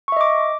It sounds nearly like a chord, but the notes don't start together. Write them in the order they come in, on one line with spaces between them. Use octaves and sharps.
C#6 E5 D#5 D6